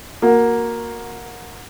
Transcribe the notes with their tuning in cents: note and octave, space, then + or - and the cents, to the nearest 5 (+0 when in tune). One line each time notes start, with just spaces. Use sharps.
A#3 +0 F#4 -25